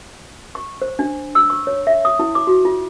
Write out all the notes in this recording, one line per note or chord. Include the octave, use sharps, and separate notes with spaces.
C#6
C5
D4
E6
C#6
C#5
E5
D#6
E4
D6
F#4
F4